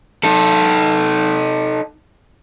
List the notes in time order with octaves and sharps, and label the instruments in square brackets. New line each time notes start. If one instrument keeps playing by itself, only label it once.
[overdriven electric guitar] D#4 A4